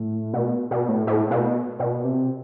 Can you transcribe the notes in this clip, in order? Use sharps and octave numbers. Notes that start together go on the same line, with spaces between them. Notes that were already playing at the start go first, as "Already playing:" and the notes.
Already playing: A2
B2
B2
A2
A2
B2
B2
C3